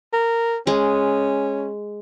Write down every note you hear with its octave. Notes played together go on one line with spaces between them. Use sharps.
A#4
G#3 C#4